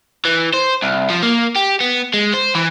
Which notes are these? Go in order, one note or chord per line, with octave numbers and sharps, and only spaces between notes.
E3
C5
C2
F3
A#3
G4
B3
G#3
C5
E3